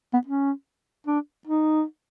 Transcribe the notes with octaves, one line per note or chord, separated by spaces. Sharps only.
B3
C#4
D4
D#4